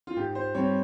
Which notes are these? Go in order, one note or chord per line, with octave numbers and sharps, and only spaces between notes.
F4
G#2 G4
C5
G3 C4 C#5